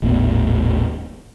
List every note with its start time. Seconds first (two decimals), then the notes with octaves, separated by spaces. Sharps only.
0.02 D#1 G#1 A2 B3